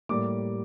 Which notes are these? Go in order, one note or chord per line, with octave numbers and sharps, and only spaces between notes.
A2 G3 A#3 D6